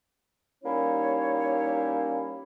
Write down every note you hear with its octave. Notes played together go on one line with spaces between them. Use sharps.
G3 A#3 C#4 D#4 E4 C#5